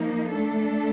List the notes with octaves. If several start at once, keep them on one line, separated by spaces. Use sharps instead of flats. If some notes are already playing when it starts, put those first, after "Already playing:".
Already playing: F3 A#3 D#4
A3 D4 A4